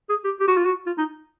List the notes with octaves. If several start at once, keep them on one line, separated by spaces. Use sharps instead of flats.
G#4
G4
G4
F#4
F4
F#4
F4
D#4